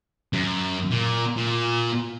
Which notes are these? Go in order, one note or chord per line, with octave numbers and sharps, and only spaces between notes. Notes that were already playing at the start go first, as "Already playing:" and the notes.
F#2
A#2
A#2